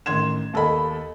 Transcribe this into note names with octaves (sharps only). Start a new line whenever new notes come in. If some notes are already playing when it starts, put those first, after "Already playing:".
A1 D#3 C6 G#6 E7
D#2 A4 D#5 B5